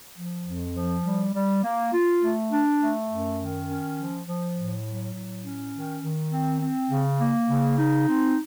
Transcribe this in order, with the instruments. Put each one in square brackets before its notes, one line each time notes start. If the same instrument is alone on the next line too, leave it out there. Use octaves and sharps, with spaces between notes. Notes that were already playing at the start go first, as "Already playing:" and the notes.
[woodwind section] F3
F2
F3
G3
G3
A#3
F4
A3
D4
A3
F#2
D#3
C#4
F3
F3
A2
F#3
A2
C#4
D#3
D#3
C4
C4
C#3
A#3
C#3
D#4
C4